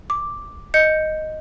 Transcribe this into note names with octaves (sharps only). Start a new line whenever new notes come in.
D6
D#5 G6 C#7